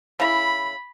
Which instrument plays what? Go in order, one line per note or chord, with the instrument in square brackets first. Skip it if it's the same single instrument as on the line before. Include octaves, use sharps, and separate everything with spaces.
[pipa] C#3 E4 [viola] B5